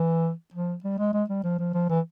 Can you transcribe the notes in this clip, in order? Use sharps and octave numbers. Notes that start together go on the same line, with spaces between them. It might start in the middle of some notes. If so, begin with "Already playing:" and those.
Already playing: E3
F3
G3
G#3
G#3
G3
F3
F3
F3
E3